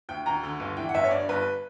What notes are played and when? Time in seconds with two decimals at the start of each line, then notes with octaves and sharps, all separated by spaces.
0.09 D2 G5
0.26 D2 A#5
0.43 D3
0.60 G1
0.77 E3 G5
0.89 F#5
0.94 G1 E5
1.04 C#5
1.11 G2 D5
1.29 G1 B4